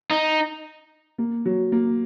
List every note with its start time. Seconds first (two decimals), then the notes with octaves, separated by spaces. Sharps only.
0.11 D#4
1.18 A#3
1.45 F#3
1.72 A#3